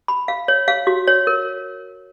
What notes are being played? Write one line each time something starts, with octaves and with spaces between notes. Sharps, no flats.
B5
F5
C#5
F5
F#4
C#5
A#4